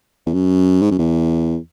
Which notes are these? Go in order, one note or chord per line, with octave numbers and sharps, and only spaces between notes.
E2
F#2
G#2
F#2
E2